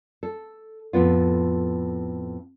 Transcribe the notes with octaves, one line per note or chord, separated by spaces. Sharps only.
A4
F2 A2 B3 F4